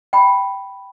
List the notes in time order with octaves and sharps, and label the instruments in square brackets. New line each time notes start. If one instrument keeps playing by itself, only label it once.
[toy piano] G5 B5